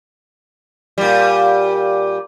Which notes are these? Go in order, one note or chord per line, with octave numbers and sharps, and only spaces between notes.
A#2 G3